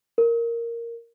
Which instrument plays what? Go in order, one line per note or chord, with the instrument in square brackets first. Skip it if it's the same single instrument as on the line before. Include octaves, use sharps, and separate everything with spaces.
[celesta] A#4